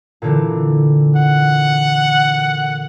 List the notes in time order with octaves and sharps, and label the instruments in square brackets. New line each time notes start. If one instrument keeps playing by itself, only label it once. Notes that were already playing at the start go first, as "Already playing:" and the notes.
[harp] A#2 D3 E3
[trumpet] F#5